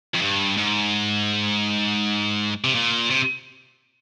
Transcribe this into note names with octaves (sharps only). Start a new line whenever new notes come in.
F2
G2
G#2
C3
A#2
C3